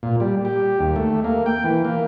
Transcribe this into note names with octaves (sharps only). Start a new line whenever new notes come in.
A#2
G3
G4
D#2
A3
A#3
G5
E3
A#3